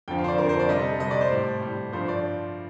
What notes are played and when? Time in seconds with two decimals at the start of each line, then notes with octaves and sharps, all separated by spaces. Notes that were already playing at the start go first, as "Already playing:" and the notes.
0.08 F2 D3 F3 G5
0.18 F5
0.24 C5
0.28 D5
0.38 F2 D3 F3 A#4
0.49 C5
0.59 D5
0.69 C3 G3 D#5
0.79 A4
0.90 A4
1.00 C3 G3 D#5
1.11 D5
1.21 C5
1.31 A2 G3
1.62 A2 G3
1.93 G2 F3 A3 C5
2.08 D5